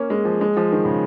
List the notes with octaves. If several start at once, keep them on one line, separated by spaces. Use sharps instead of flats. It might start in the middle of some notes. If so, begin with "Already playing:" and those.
Already playing: A#3 C#4
G#3
F3
G#3
F3
D#3
C#3